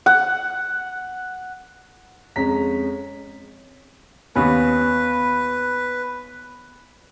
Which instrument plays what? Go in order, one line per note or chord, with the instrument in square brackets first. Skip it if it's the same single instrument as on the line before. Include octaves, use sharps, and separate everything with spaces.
[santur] F#5
[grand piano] F2 G#3 C#4 A#5 B6
[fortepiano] D#2 B3 C#4 [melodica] B4